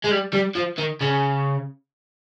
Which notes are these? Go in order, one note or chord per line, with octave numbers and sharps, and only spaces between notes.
G#3
G3
G3
F3
D#3
C#3